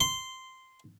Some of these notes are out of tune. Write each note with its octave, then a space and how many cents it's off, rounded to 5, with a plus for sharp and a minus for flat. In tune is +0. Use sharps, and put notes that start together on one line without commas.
C6 -10